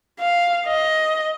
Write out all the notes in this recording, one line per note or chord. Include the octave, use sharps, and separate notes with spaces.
F5
D#5